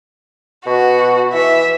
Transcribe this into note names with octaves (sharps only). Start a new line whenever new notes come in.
B2 F#4
E3 E5